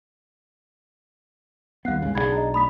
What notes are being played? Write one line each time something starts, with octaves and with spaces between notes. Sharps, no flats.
D#2 G3 B3 F5 F#6 C7
G#1 C#3 G#3
B1 F3 D4 G#4 B5 G#6
D#5 A#5
A3 B5 D#6 B6